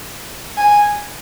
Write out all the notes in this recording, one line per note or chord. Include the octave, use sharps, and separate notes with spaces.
G#5